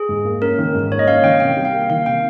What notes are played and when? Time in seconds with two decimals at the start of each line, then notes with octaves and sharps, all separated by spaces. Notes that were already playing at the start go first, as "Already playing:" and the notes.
Already playing: G#4
0.09 G#2
0.25 A#3
0.42 C#4 A#4
0.58 D#3
0.75 G#2
0.91 A#3 C#5
0.99 D#5
1.08 C#4 F5
1.23 D#3 G5
1.40 C3 G5
1.57 G3
1.65 F5
1.73 A#3
1.90 D#3 F5
2.06 C3 G5